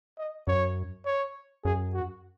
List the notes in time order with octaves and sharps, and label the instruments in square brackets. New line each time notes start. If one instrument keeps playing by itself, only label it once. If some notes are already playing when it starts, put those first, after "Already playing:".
[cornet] D#5
[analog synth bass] F#2 [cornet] C#5
[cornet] C#5
[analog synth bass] F#2 [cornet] G#4
[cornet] F#4